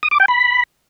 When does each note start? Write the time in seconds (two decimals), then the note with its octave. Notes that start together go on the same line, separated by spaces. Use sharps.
0.03 D#6
0.11 D6
0.20 G5
0.28 B5